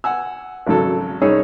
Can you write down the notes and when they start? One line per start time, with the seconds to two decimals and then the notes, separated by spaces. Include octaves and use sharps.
0.04 F#5 G#5 E6
0.67 G#1 C#3 F#3 A4
1.21 C2 C#4 D#4 G#4 C#5 E6